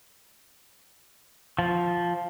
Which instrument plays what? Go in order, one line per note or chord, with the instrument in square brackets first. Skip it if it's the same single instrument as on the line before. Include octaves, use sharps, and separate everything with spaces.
[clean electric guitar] F3